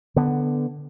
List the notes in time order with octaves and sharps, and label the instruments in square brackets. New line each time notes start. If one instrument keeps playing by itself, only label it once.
[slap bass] D3 B3